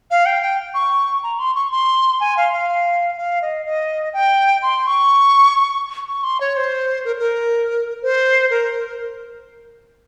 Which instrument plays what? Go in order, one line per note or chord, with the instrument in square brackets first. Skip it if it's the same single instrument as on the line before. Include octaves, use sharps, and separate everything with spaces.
[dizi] F5
G5
G5
C#6
A#5
C6
C#6
C6
G#5
F5
F5
F5
D#5
D#5
G5
C6
C#6
C#6
C6
C#5
C5
A#4
A#4
C5
A#4